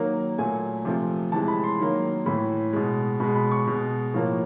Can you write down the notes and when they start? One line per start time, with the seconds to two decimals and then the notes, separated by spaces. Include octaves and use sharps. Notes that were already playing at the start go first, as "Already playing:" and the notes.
Already playing: D#3 F#3 A#3
0.38 A#2 F#3 A3 G#5
0.85 C3 F3 A3
1.32 C3 E3 G#3 A5
1.48 B5
1.64 C6
1.79 D#3 F#3 A#3
2.26 A2 E3 A3 B5
2.73 B2 G#3
3.20 B2 G#3 B5
3.36 B5
3.52 C#6
3.67 B2 G#3
4.14 A2 F3 A#3